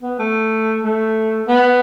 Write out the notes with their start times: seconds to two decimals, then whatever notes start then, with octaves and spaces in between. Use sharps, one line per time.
0.03 B3
0.19 A3
0.83 A3
1.48 B3